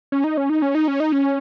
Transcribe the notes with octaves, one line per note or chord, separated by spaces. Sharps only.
C#4
D#4
C#4
D#4
C#4
D#4
C#4
D#4
C#4